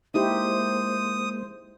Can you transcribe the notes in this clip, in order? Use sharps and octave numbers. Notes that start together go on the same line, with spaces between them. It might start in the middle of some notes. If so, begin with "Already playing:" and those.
G#3 A#3 D#4 E4 G4 C5 D#6